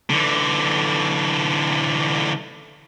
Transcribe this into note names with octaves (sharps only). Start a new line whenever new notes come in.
D3 E3